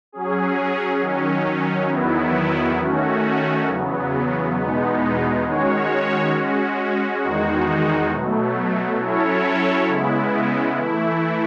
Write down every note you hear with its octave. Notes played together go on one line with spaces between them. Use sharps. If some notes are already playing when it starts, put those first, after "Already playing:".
F#3 C#4 G#4
D#3 F#3 C#4
E2 D#3 F#3 B3 E4
D#3 A3 C#4 F#4
E2 C#3 F#3 B3
E2 B2 G#3 B3 D#4
D#3 G#3 C#4 F#4 C#5
G#3 C#4 F#4
E2 D#3 G#3 D#4 F#4
B2 F#3 A3
F#3 C#4 E4 A4 C#5
C#3 G#3 B3 E4
E3 A3 E4